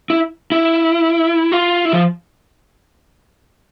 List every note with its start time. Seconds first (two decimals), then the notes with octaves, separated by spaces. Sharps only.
0.10 E4
0.52 E4
1.52 F4
1.85 E4
1.93 F3